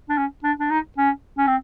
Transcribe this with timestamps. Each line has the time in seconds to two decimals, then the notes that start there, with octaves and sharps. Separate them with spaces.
0.09 D4
0.17 C#4
0.44 D4
0.60 D4
0.71 D#4
0.98 C#4
1.38 C#4
1.47 C4